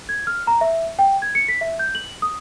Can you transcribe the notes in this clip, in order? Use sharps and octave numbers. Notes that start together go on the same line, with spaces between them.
G#6
F6
A#5
E5
G5
G#6
C#7
B6
E5
G6
F#7
D#6